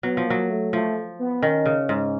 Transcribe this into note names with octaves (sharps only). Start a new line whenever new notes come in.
F#3 B3
F3
F#3 A#3
A3
F3 A3
B3
D#3 C#4
C#3
G#2